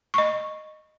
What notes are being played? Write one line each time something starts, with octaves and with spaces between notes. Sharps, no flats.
D#5 C#6